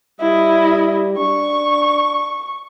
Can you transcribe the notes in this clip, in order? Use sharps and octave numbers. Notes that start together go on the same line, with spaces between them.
G3 E4 D#5
D4 C#6